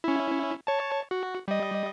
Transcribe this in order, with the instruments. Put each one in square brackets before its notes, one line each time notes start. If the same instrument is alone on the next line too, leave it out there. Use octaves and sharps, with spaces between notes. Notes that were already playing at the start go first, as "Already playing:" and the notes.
[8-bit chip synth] C#4 E4
C#5 A5
F#4
G3 D#5